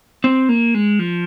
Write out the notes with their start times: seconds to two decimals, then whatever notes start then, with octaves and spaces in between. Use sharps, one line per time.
0.24 C4
0.49 A#3
0.74 G#3
0.99 F3